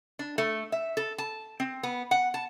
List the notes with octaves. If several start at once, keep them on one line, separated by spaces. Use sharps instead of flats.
D4
A3
E5
A4
A5
C4
B3
F#5
A5